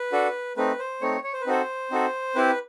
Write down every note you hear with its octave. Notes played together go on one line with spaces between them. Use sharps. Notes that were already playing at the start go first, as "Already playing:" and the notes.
Already playing: B4
D4 F#4 A4
A3 C4 D#4 B4
C5
A3 C4 D#4 C#5
C#5
C5
B4
C4 D#4 F#4 A4 C5
C4 D#4 F#4 A4
C4 E4 G4 B4